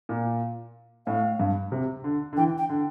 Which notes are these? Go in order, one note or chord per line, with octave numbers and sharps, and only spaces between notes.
A#2
A2 F5
G2
C3
D3
D3
E3 G5
G5
D3